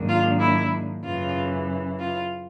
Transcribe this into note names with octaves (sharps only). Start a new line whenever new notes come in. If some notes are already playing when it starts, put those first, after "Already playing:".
Already playing: G#2 D#3 F#3 A#3 D4
F4
E4
F#2 C#3 E3 F4
F4